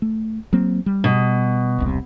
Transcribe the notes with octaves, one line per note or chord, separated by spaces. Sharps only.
A3
F#3 A#3 C4
G3
B2
E1 C2 C3